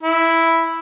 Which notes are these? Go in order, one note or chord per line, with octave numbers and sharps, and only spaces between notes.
E4